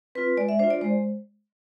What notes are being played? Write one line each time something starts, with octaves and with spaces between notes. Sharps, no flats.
C4 F4 B4
G#3 D5
E5
D4 F4 C5
D5
G#3 C5